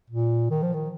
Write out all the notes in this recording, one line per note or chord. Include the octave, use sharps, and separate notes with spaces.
A#2
D#3
F3
D#3